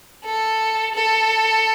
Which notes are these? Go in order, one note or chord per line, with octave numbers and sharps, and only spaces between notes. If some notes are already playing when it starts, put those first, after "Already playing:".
A4
A4